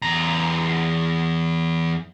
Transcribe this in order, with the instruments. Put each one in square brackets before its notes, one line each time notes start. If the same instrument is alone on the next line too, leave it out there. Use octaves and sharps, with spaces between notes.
[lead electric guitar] E2 A#5